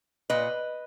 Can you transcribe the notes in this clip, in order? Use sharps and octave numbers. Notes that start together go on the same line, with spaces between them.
A#2 B4 D#5